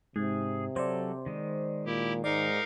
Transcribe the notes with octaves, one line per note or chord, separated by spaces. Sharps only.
G#2 C3 G#4
F#3 A4 C5 D5
D#3 G#3
A#2 E4 G4
G#2 D#4 A#4 D5 F5